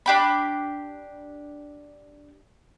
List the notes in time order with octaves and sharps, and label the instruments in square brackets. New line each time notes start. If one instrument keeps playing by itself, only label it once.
[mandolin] D4 G4 B5